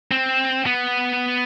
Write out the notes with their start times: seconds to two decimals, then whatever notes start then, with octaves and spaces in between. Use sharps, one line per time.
0.11 C4
0.66 B3